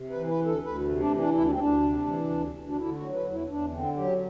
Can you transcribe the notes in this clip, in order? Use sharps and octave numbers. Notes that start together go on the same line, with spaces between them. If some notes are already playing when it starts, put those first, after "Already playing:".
Already playing: C3
B4
E3
B4
D2
A4
D2 B4
C3
D4
E3
D4
D2 E4
D4
C4
D2 D4
C3
E3
D2
D2
D4
D3 E4
F#4
F#3
B4
E2
E4
E2 D4
D3 C4
F#3 G4